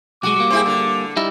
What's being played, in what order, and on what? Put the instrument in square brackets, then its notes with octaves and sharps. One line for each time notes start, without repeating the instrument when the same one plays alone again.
[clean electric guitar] B1 G#3 [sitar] F#4 [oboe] D6
[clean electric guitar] G3 A#3
[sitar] C4 E4 G#4
D3
[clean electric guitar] G3 D#4 E4